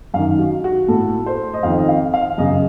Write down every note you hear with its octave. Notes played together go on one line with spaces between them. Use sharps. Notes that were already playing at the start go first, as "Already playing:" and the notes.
F#2 D#3 F5
F#4
F#4
A2 A4
C5
D#5
F2 F5
D#3
D#5
F5
F5
F#2 C#3 D#5